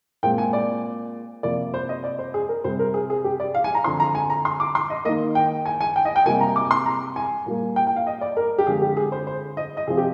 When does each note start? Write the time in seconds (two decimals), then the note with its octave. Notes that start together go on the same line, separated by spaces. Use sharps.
0.23 A#2 G#3 C4 G5
0.38 G#5
0.53 D5
1.43 C3 F3 A#3 D5
1.74 C5
1.89 D#5
2.04 D5
2.19 C5
2.34 G#4
2.49 A#4
2.64 C3 G3 C4 C5
2.79 A#4
2.94 G#4
3.10 G#4
3.24 G4
3.40 D5
3.55 F5
3.64 G#5
3.75 A#5
3.84 D3 F3 C4 C6
4.00 A#5
4.15 G#5
4.30 A#5
4.45 C6
4.60 D6
4.75 C6
4.90 D#5
5.05 A#3 D#5
5.09 D#3
5.35 G5
5.66 G#5
5.81 G#5
5.96 G5
6.05 D#5
6.16 G5
6.26 C3 G3 A#3 G#5
6.41 A#5
6.56 D6
6.71 C6
6.86 A#5
7.16 G#5
7.46 A#2 G3 A#3
7.76 G5
7.87 G5
7.96 F5
8.07 D#5
8.21 D5
8.37 A#4
8.58 G4
8.67 D3 F3 G#3 C4 G#4
8.82 G4
8.97 G#4
9.12 C5
9.27 C5
9.57 D#5
9.77 D#5
9.87 C3 F3 C4 G#4
9.97 G4